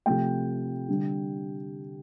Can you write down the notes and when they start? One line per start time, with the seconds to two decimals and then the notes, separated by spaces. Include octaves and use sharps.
0.06 C3 F3 A3 G5
0.89 D3 G3